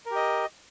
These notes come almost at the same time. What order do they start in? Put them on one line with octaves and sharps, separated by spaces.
A#4 G4 D#5